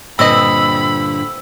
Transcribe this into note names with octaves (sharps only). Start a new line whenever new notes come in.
G2 A#2 D3 C4 D#5 B5 E6